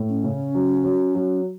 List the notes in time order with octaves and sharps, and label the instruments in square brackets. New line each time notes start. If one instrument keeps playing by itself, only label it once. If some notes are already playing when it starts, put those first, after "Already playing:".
Already playing: [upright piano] A2
[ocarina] C#4
[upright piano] C#3
F#3
F#3
F#3